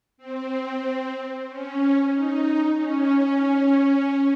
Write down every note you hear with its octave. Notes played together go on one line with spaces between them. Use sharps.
C4
C#4
D#4
C#4